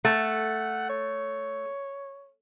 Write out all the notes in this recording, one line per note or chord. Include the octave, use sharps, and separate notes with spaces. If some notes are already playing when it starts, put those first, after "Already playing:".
A3 F#5
C#5